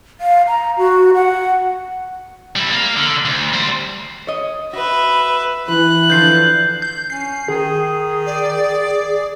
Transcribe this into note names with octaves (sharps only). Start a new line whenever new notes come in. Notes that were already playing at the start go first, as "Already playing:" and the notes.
F5
A#5
F#4
F#5
G3 E4
A#3 F5
D3
D2
G3 C5
C#5 D#5
F#4 B4 E5
E3 B4 F#6
D3 F3 D4 G6 C7
G6
C#4 C7
D#3 G#4
D5